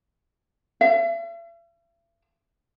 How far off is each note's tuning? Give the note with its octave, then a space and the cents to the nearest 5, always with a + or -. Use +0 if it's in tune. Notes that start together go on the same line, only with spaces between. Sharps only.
E5 +45